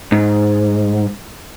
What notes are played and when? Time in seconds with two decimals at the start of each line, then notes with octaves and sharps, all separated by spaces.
0.12 G#2